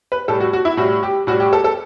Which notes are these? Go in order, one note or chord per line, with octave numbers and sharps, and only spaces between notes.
B4
A2 G3 A4
F#4
F#4
E4
A2 G3 F#4
G4
A2 G3 F#4
G4
A4
A4